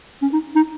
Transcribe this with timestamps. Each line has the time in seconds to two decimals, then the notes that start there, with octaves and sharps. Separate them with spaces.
0.22 C#4
0.33 D#4
0.56 D#4